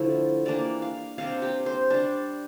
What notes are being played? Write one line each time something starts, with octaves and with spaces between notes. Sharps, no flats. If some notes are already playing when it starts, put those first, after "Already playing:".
Already playing: D3 F3 A3 E4
E3 G3 A#3 D4 D5
F5
C3 G3 D4 F5
G4
C5
G3 D4